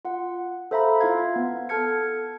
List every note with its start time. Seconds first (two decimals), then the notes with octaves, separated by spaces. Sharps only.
0.05 F4 F#5
0.71 A4 C5 E5 F5 A#5 B5
1.01 E4 F4 F5 G#6
1.36 B3
1.69 A4 A5 F6 G#6 C#7